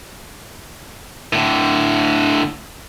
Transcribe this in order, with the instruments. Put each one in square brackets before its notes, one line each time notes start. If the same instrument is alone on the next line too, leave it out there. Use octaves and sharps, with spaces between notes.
[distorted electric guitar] A2 D3